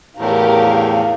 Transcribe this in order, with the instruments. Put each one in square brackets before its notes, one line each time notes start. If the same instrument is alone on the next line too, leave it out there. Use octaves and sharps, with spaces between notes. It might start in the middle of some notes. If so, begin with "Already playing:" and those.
[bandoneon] E2 A2 [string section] G4 A#4 [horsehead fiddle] F5